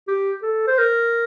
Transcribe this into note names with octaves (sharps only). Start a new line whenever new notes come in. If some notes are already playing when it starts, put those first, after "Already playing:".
G4
A4
C5
A#4